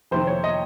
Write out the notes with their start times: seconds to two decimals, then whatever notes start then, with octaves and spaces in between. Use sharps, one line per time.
0.11 F2 C3 D#3 C5
0.27 C#5
0.44 D#5